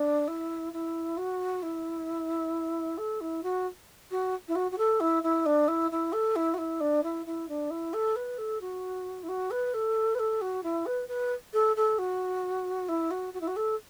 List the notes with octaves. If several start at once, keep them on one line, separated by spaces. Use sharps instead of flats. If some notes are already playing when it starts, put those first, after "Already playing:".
Already playing: D4
E4
E4
F#4
E4
A4
E4
F#4
F#4
E4
F#4
F#4
A4
E4
E4
D4
E4
E4
A4
E4
F#4
E4
D4
E4
E4
D4
E4
A4
B4
A4
F#4
E4
F#4
B4
A4
B4
A4
F#4
E4
B4
B4
A4
A4
F#4
E4
F#4
F#4
E4
F#4
A4